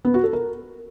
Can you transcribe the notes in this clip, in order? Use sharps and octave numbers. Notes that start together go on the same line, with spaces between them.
B3
F#4
A4
A#4